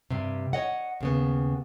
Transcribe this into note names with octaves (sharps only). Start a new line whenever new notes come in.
G2 C3
C#5 D#5 F#5
D#2 C#3 B3